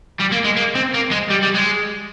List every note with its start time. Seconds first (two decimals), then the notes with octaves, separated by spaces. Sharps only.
0.20 G3
0.32 A#3
0.44 G#3
0.57 A#3
0.75 C4
0.94 A#3
1.11 G#3
1.30 G3
1.43 G3
1.55 G#3